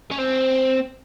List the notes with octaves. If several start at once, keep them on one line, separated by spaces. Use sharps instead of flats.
C#4
C4